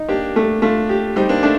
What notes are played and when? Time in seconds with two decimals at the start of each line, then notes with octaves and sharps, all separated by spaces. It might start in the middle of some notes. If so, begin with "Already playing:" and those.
Already playing: D#4
0.09 A#3 D4 G4
0.36 A3
0.62 A3 D4 F4
0.89 G4
1.16 G3 C4 D#4
1.29 A#3 D4
1.43 A3 C4 D4